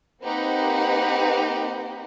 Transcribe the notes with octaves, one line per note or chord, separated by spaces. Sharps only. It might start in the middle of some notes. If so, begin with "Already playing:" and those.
A#3 C4 D#4 G4 B4 F#5